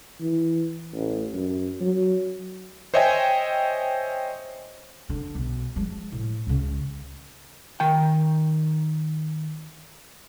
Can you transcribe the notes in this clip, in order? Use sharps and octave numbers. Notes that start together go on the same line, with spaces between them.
E3
A1
F#2
F#3
C5 C#5 D#5 E5 G5 G#5
D3
B1
F3 G#3
A2
C#2 C#3
D#3 G5